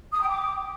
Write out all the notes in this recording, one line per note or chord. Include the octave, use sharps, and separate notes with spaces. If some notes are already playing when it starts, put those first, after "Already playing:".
D#6
G5
D6